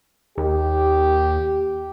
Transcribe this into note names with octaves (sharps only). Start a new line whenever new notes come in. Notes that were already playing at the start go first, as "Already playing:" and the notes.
D#2 G4